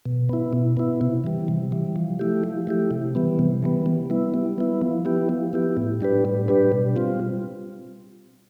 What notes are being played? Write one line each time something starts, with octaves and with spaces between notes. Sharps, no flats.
B2
B3 E4
B2
B3 E4
C3
E3 G3
C3
E3 G3
F3
A3 E4 G4
F3
A3 E4 G4
C3
E3 G3 B3
C3
E3 G3 B3
G3
B3 E4
G3
B3 E4
F3
B3 E4 G4
F3
B3 E4 G4
A2
G3 D4 G4 B4
A2
G3 D4 G4 B4
B2
G3 C4 F4